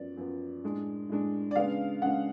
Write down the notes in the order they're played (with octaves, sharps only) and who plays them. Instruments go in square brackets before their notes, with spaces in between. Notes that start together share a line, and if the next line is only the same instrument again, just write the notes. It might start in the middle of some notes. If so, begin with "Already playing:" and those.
Already playing: [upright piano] F#2 F3 B3 D5
F#2 F3 B3
A2 G#3 D4
A2 G#3 D4
D5
C#3 G#3 B3 D4 F5
C#3 G#3 B3 D4 F#5